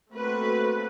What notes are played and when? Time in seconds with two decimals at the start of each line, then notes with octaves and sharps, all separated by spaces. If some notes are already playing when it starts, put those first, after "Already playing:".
0.11 A3 A#3 C4 F#4 A4 B4